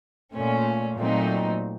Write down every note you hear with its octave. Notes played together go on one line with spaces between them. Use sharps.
A#2 A3 C#4
A#2 F#3 A3 C4 D#4